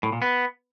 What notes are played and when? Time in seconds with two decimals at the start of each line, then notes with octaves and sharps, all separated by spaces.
0.03 A2
0.12 A#2
0.22 B3